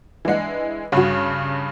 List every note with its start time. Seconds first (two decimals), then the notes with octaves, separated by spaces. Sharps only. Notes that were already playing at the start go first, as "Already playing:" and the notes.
0.25 E3 G#3 D4 F#5
0.92 G2 C#3 F#4 C#5